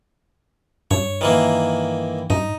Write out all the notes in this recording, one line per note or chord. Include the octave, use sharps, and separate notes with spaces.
G2 C#5
D#3 E3 A#3
G2 D#4